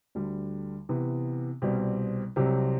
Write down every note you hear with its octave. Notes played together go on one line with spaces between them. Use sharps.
D2 D3 G3
C3 E3 B3
C2 B2 G3 C4 G4
C2 C3 F#3 C4 G4